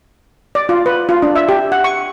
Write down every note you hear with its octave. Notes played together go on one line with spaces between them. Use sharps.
D5
F4
B4
F4
D4
E5
G4
F#5
C#6